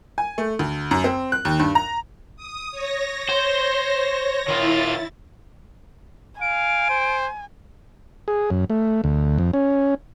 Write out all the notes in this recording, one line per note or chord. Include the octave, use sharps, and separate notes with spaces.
G#5
A3
D2
F#2
C4
F#6
D#2
G2
A#5
D#6
C#5 A#6
C5
D#3 E4 F4 A6
F5 G#5 D7
C5
G#4
F#2
A3
D2
F2
C#4